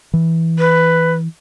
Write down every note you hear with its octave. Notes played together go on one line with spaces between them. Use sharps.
E3
B4